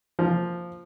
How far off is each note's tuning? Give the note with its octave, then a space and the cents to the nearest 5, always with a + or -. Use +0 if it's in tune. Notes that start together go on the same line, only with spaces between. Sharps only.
F3 +0 A#3 -10